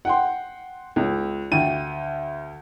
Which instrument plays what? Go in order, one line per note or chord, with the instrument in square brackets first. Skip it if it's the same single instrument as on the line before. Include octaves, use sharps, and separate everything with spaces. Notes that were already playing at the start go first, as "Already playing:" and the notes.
[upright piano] F#5 G5 C6
C#2
D2 G5 D#7